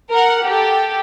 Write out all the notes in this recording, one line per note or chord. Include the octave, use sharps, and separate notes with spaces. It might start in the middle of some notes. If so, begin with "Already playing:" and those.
A#4 F#5
G4 A4